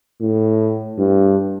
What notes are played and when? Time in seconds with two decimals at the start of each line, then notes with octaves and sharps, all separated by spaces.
0.21 A2
0.98 G2